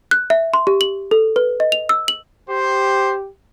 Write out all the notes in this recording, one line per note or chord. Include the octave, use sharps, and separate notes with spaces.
F#6
E5
C6
G4
F#7
A4
B4
D#5
F7
E6
F#7
G4 C5